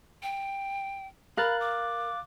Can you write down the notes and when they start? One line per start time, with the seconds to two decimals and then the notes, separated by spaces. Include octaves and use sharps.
0.23 G5
1.37 A#4 F5 B5 F#6 A6
1.60 D6